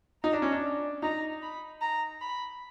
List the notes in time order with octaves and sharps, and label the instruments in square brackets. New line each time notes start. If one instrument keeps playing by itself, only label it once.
[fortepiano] D#4 [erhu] A#5
[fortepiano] D4
C#4
D4
[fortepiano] D#4 [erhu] A#5
[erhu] B5
A#5
B5